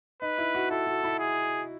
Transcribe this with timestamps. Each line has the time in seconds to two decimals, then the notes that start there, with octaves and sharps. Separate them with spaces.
0.22 D#4 B4
0.38 E4
0.55 F#4
0.70 E4 A4
0.87 F#4
1.04 E4
1.20 G#4